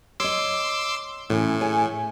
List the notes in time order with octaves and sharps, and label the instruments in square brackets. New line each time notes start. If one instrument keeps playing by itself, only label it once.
[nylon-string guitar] C#5 D#5 [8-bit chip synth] C6 D6 E6
[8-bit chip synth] A2 [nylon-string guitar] E3 C#4
[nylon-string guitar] G#4 C#5 G#5